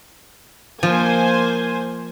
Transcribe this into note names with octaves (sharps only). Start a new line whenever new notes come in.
F3 A#3 C5 G#5